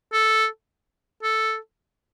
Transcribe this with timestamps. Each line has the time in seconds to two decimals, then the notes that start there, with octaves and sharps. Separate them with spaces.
0.12 A4
1.23 A4